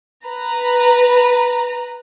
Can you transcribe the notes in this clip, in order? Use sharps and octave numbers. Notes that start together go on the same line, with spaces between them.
B4 A#5